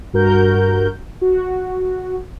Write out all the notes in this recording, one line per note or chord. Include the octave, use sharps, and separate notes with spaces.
G2 F#4 A#4 G6
F#4